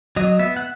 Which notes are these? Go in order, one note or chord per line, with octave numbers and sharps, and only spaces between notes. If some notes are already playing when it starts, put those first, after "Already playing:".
F#3 D#5
B3 E5
F#5